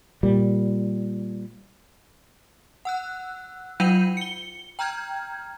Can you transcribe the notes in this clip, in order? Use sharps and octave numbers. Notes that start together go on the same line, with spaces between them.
A#2 G3
F#5 E6 F#6
F#3 F4 F#5 G5 G6 D#7
C#7 G7
G5 A#5 F6 G6 G#6